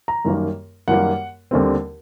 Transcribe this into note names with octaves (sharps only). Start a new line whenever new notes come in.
A#5
F#2 D#3 G3 A#3
F#2 D#3 G3 A#3 F#5
D#2 D3 G3 C4